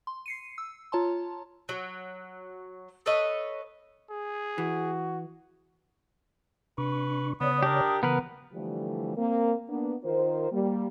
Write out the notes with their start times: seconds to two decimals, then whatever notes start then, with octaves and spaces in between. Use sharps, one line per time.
0.07 C6
0.26 C7 C#7 D#7
0.58 E6
0.92 F4 C#5 A5 A#5 C6
1.69 F#3
3.06 A4 B4 C#5 D#5
4.10 G#4
4.58 E3 F#4
6.78 C3 D4 B4 C#6
7.41 C#3 B3 C#5 D5 D#6
7.63 D4 G4 A#4
8.03 C#3 E3 B3 A#4 B4
8.53 D3 E3 F3 G3 A3 G4
9.17 A#3 C4 A#4
9.69 A#3 B3 D4
10.04 D#3 F4 A#4 C5
10.52 G3 A#3